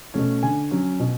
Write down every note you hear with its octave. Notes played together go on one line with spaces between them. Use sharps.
B2 A3 C#4
D3 G#5
F#3 C#4
B2